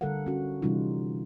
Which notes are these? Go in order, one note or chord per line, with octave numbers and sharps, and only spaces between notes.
D3 G3 A4 A#4 F5 F#5
C#4 F#4
C3 E3 G3 C#4 D#4 F4